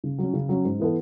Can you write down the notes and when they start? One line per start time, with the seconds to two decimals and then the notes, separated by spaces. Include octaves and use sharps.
0.04 C#3
0.18 F#3 C#4
0.34 C#3
0.49 F#3 C#4
0.65 G#2
0.80 E3 B3 E4 A4